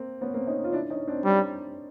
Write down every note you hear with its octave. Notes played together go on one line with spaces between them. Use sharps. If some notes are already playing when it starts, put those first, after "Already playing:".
Already playing: A#3 C4
B3 C#4
A#3 C4
C#4 D#4
F4
D4 E4
C#4 D#4
C4 D4
G3